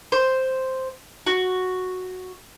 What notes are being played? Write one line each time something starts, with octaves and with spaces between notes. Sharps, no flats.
C5
F#4